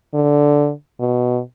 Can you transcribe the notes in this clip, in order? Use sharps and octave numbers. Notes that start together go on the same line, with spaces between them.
D3
B2